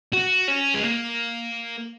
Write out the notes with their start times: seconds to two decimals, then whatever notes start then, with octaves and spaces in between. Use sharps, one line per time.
0.13 F#4
0.48 C#4
0.74 G#3
0.83 A#3